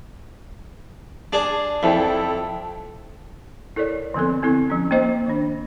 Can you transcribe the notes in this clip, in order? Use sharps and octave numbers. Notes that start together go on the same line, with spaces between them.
D4 G#4
F2 E4 A4 G5
E4 A4 A#4 C#5 D5
D3 F3 B3 C4 A4
B3 C4 E4 A4
F3 C#4
A#3 C#4 D#4 C5 D#5 G5
D#3 D4